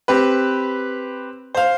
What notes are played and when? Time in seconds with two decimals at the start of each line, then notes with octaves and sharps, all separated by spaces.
0.08 C4 G4 B4
1.55 C5 F5